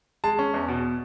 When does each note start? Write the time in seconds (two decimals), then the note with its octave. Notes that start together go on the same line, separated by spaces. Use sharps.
0.24 G#3 A5
0.39 C#4
0.54 E2
0.68 B2